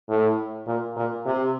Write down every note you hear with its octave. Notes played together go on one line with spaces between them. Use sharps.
A2
A#2
A#2
C3